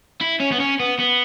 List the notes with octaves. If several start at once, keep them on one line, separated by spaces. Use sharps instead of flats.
E4
C#4
B3
C#4
B3
B3